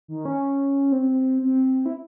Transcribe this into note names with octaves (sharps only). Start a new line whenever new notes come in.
D#3
C#4
C4
C4
E4